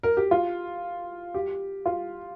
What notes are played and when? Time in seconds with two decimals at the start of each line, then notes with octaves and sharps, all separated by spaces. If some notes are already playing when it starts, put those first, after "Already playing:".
0.03 A#4
0.17 G4
0.31 F4
1.34 G4
1.86 F4